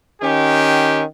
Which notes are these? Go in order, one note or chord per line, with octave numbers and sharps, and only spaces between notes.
D#3 C#4 G4